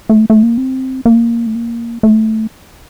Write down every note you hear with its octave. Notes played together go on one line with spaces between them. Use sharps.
A3
A3
A#3
C4
A#3
A3
A#3
A3